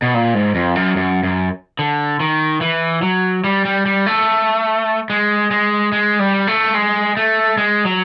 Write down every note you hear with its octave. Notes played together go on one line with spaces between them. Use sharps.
B2
A#2
G#2
F2
F#2
F#2
F#2
D3
D#3
E3
F#3
G3
G3
G3
A3
G#3
G#3
G#3
G3
A3
G#3
A3
G#3
F#3